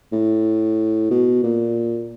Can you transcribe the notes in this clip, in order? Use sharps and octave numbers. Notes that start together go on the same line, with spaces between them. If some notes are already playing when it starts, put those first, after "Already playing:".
A2
B2
A#2